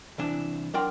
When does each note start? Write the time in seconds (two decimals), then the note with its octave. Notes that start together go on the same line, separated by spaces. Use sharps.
0.18 C2 E3 D4
0.74 F#3 D4 A#4 D5 G5 C6